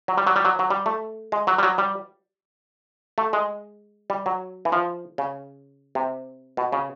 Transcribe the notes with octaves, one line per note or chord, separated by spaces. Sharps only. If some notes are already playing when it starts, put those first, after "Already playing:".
F#3
G3
F#3
G3
F#3
F#3
G3
A3
G#3
F#3
G3
F#3
G3
A3
G#3
G3
F#3
E3
F3
C#3
C3
B2
C#3